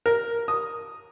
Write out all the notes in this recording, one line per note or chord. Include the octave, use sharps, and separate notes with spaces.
A#4
D#6